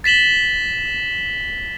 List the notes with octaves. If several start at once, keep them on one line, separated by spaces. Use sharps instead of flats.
A6 B6 E7 F#7 G7